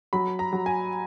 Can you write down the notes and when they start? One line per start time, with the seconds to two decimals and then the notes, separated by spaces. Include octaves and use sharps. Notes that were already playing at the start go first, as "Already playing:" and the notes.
0.13 F#3 B5
0.39 A#5
0.53 F#3
0.66 G#5